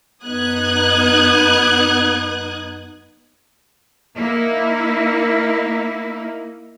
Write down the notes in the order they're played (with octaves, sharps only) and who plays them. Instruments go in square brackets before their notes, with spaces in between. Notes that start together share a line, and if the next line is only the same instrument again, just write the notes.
[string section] F#2 B3 D#4 D#6 F#6 G#6
[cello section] A#3 D#4 E4